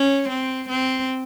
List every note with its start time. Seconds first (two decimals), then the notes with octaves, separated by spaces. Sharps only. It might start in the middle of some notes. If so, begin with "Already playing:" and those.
Already playing: C#4
0.29 C4
0.69 C4